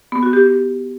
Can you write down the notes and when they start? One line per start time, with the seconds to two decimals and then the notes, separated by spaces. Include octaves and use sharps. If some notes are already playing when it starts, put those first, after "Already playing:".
0.12 B3
0.23 F#4
0.33 G4